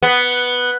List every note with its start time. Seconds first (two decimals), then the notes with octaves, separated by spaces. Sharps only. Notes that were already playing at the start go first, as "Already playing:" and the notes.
0.03 B3